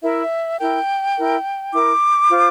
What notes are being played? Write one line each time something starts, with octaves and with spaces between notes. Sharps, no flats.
E4 A#4 E5
E4 A#4 G5
E4 A#4
E4 A#4 D6
F4 C5